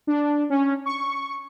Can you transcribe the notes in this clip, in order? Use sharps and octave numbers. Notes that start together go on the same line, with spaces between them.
D4
C#4
C#6